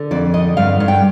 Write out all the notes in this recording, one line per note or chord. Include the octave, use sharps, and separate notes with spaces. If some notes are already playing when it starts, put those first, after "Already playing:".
Already playing: D3
F2 D5
D3 D#5
G2 F5
G2
G5